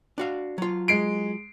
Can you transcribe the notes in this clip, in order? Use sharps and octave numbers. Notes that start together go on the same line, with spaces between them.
D4 F#4 F5
F#3 F4
G#3 C7 D7